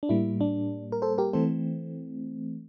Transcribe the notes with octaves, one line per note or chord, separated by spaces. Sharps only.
D4
A2 G3 A#3 E4
D4
A#4
A4 C5
G4 A#4
E3 A3 C4 A4 C5